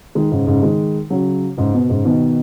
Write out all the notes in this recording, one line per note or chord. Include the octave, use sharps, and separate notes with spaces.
D#3 G#3
G#2 C#3
G#2 C#3
D#3 G#3
C#3 F#3
G#2 C#3
B2
G#2 C#3
B2 D#3